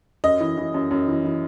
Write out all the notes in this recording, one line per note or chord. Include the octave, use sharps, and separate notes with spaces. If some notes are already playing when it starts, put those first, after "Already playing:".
F#2 D#5
E3
E3
F#2
F#2
E3
E3